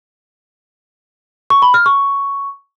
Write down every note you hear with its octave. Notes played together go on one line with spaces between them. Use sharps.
C#6
B5
F6
C#6